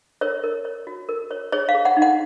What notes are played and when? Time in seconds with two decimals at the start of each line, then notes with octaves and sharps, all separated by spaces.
0.21 A#4 C#5
0.44 A#4
0.65 C#5
0.87 F#4
1.09 A#4
1.31 C#5
1.52 G#4 C#5
1.69 F5
1.75 G#4
1.85 F#5
1.97 D#4
2.02 F#5